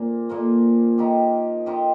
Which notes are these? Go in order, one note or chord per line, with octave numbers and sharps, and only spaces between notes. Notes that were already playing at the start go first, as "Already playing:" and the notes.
Already playing: A#2 F3 A#3
A#2 F3 A#3
F3 D#4 G4
F3 D#4 G4